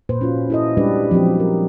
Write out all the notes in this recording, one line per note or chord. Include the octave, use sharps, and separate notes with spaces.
A#2 B4 C5
C#4 F4 F#4
E4 A4 D#5
G3 G#3 D4 G4 B4 D5
F3 F#3 C4 G4
A#4